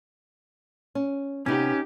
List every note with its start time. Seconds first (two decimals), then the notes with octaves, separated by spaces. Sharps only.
0.95 C#4
1.46 C3 B3 C#4 D#4 G4